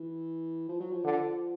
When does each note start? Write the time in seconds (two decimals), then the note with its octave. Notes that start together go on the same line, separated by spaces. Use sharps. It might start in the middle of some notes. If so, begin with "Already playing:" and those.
Already playing: E3
0.69 F3
0.80 F#3
0.92 F3
1.04 D3